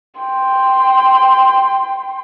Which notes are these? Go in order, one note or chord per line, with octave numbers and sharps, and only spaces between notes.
G5 C6